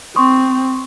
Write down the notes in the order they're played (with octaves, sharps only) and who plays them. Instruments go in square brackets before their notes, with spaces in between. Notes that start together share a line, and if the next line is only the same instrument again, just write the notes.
[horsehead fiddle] C4 [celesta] C6 C#6 D#6